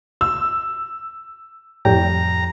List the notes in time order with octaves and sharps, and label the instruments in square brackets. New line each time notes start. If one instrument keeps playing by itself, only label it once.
[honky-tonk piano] E6
[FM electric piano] F2 G5 [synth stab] A2 G3 [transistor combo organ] A#5